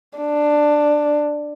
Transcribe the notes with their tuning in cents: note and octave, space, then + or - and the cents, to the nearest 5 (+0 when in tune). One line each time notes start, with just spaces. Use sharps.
D4 +10